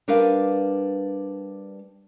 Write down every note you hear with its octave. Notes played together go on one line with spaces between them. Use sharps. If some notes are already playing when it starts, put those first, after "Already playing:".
G3 D4 A#4 B4 F5